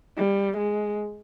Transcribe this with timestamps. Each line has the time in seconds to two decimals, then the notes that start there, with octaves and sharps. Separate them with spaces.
0.17 G3
0.58 G#3